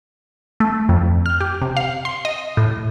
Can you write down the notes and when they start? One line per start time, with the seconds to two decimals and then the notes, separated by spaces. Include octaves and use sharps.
0.60 A3
0.89 F2
1.26 F6
1.41 G4
1.62 C3
1.77 F5
2.05 C6
2.25 D#5
2.57 A2